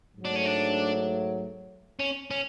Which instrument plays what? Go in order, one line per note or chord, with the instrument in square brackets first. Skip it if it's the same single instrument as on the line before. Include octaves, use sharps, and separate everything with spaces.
[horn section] G#2 F#3 A3
[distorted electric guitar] D4
C#4
D4
C#4
C#4